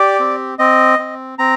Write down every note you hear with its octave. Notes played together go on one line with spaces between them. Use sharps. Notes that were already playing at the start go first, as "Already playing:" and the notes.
Already playing: G4 D5
C4
C4 D#5
C4
C4 A#5